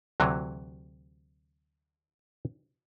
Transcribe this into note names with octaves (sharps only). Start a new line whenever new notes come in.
D2 C3 E3 F#3